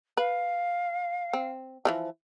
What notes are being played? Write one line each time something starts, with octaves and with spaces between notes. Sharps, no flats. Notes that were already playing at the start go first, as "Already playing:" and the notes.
B4 F5
C4
E3 F3 G3